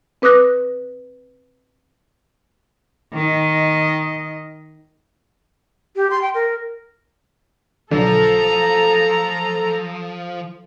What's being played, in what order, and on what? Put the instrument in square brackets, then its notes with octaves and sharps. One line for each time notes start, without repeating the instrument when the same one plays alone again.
[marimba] C4 B4 D6 D#6 F#6 A#6
[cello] D#3 D#5
[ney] G4
C6
G5
A#4
[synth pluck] B1 D3 [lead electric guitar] F3 [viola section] A4 A#5